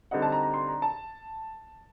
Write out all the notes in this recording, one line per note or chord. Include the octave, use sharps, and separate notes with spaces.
D3 G3 C4 D#4 F#5
A5
A#5
A#5
C6
A#5
A5